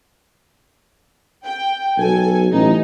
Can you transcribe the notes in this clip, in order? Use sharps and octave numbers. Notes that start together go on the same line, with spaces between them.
G5
B1 A4 G#5
A1 D#4